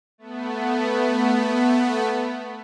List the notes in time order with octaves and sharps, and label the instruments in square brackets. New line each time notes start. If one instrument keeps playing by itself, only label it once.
[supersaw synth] A3 B3